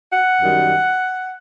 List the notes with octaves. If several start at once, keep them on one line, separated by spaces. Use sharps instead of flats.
F#5
F#2 D#3 G3